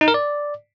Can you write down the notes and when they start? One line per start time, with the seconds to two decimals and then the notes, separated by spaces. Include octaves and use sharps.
0.01 D#4
0.08 A#4
0.14 D5